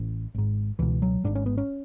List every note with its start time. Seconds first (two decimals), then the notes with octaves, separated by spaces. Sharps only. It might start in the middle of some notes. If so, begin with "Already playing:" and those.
Already playing: A1
0.34 G#1 G#2
0.79 C#2 B2 E3
1.02 F#3
1.24 G#1 G#2 D4
1.35 C#4
1.46 B3
1.58 C#4